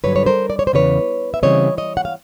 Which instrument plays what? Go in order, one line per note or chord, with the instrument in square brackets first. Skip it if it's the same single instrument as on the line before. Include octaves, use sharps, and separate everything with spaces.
[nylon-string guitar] G2 D3 F#3 B4 C#5
C#5
A#4 C5
D5
C#5
C5
E2 C#3 E3 B4 C#5
E5
C#3 E3 G3 C4 C#5 D#5
C#5 D#5
F#5
F5